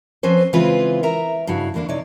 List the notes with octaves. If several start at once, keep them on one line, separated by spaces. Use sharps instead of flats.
F3 C4 C#4 B4 C5
C#3 E3 G#3 C4 F4 B4
A#4 E5 A#5
G2 C#3 E4 F#4 F5
E2 D3 A#3 D4 E4
C3 D#4 C#5 D5